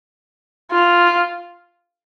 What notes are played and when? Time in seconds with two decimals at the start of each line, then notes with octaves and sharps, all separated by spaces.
0.72 F4